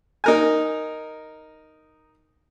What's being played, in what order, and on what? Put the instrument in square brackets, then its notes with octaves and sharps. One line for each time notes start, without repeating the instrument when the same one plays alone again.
[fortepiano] D#4 A#4 G#5